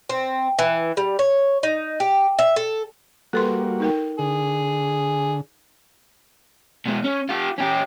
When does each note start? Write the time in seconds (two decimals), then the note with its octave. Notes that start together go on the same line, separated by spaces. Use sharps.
0.09 C4
0.59 E3
0.97 G3
1.19 C#5
1.63 D#4
2.00 G4
2.39 E5
2.56 A4
3.33 G3 A#3 F#4 A4 B4 C6
3.80 D#4 A#4 G5
4.19 D3 G#4
6.86 B2 G#3
7.04 C#4
7.29 F4 G4
7.58 C#4 G4